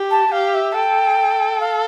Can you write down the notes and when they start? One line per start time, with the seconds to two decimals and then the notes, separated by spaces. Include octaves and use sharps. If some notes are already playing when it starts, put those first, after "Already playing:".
Already playing: G4
0.11 A5
0.32 G4 F5
0.54 E5
0.75 A4 G5
1.61 F5